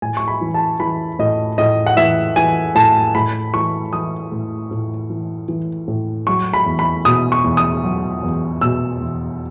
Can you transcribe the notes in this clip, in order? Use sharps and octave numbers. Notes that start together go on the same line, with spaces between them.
A2 G#5
C#6
B5
E3
A5
E3 B5
A2 D#5
A2 D#5
F#5
E3 E5
E3 G#5
A2 A5
A2 B5
E3 C#6
E3 D#6
A2
A2
E3
E3
A2
F#3 C#6
B5
E2
B5
B2 D#6
C#6
E2
D#6
F#3
E2
B2 E6
E2